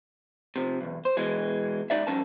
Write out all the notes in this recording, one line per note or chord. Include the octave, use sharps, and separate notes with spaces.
C3 F3
B1 E2
C5
B2 E3 G#3
G#2 F#3 D#4 D5 E5
G2 F3 C#4 A#4 A5